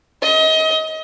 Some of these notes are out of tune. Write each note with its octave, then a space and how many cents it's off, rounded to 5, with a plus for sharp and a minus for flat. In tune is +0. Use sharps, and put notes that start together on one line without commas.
D#5 +30